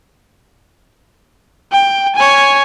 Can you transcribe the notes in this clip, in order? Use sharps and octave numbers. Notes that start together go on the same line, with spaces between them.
G5
C#5 G#5